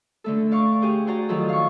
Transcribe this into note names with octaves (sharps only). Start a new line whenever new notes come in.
D3 A3 A4
D5 F5 C#6 D6
G4 G#4 C5
F#4 C5 D5 A#5
D#3 F3 F#3 F4 A4
F5 C#6